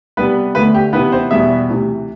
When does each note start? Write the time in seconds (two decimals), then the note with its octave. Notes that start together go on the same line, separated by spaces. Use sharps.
0.17 C3 G3 B3 B4
0.55 D2 D3 A3 B3 B4
0.75 G4
0.93 C3 E3 B3 E4 B4
1.12 C4 C5
1.31 E2 B2 G3 B3 E4 E5
1.69 D2 C3 E3